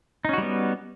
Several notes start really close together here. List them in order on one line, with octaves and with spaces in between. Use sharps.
D#4 C#4 F#4 G3 B3